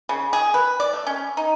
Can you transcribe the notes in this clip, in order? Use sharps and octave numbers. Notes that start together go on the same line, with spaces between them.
C#3
G#4
B4
D5
A3
C#4
D#4